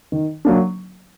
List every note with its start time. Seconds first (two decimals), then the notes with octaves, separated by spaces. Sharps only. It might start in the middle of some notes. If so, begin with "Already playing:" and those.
0.12 D#3
0.45 F#3 A#3 D4